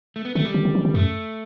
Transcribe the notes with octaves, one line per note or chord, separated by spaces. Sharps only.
A3
B3
D3 A3
G3
D3
D3
E3
D3
F#2 A3